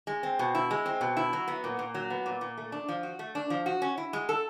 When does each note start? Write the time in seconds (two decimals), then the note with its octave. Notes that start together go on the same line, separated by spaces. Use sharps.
0.07 G#3
0.23 C4
0.39 B2
0.55 E4
0.71 G#3
0.86 C4
1.01 B2
1.17 E4
1.33 F#3
1.48 B3
1.64 A#2
1.79 A#2
1.95 F#3
2.10 B3
2.26 A#2
2.41 A#2
2.58 A3
2.72 D4
2.89 F3
3.03 F#4
3.19 A3
3.35 D4
3.50 F3
3.66 F#4
3.82 C#4
3.98 E4
4.13 G#3
4.29 A4